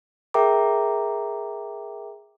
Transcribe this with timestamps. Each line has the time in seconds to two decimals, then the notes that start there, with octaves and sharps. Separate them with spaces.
0.34 G#4 A#4 E5 G5 A#5 D6